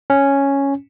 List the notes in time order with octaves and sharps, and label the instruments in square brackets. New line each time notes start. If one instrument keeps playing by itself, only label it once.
[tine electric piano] C#4